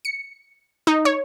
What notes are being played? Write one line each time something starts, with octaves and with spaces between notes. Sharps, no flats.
C#7
D#4
C#5